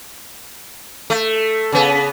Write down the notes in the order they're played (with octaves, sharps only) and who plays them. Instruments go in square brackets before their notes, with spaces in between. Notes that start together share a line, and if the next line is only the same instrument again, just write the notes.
[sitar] A3
C#3 B3